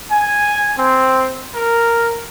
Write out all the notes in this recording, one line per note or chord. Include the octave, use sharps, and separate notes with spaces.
G#5
C4
A#4